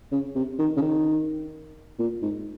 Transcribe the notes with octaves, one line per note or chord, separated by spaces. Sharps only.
C#3
C3
D#3
C#3
D#3
A#2
G#2